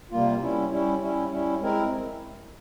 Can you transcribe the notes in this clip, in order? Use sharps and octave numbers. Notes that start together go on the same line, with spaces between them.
C3 G3 A#3 F4
G3 C#4 E4
G3 C#4 E4
G3 C#4 E4
G3 C#4 E4
G#3 C4 E4 A#4